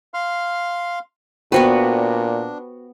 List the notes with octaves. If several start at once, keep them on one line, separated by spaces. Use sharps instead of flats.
F5 C6 F6
A#2 B3 D4 F#4 G4 B4 C5 G5